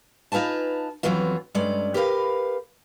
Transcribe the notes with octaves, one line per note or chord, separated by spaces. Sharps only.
D#4 F4 B4 G#5 A5
F2 A2 E3 F#3 B3 F4
G2 G#3 A3 C#4 D5
G4 A#4 B4 F5